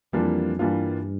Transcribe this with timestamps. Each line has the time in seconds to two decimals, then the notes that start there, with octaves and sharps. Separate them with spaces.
0.13 F2 E3 G3 A#3 D4 F4
0.59 G2 E3 G3 A#3 D4 F4